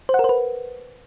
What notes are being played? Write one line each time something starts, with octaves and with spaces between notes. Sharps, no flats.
C5
F#5
A#4
C5
B4